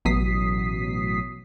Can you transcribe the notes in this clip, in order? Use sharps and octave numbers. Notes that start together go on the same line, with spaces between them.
A1 B2 F#3 D#6 B6 C7